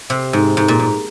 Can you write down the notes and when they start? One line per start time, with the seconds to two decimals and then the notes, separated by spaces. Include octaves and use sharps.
0.10 C3
0.33 G#2
0.57 G#2
0.68 A#2
0.80 G#2